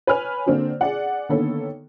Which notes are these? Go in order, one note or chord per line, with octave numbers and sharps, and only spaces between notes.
B4 C#5 G#5 F6
D3 A#3 C4 D4 F#4
G#4 D5 F#5
D3 D#3 A#3 B3 A4 C#5